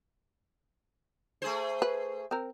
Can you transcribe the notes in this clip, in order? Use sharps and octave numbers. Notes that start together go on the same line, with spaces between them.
A3 G#4 C5
B4
C4 A#4